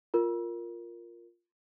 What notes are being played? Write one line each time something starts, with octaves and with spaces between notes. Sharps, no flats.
F4 A#4